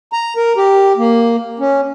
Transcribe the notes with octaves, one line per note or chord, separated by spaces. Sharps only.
A#5
A#4
G4
A#3
C#4